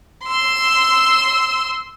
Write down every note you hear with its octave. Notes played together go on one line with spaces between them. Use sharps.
C6 E6